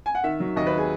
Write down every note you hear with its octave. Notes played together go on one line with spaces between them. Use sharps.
G#5
F#5
D#3 E5
F#3
D#2 D#5
B4
G#4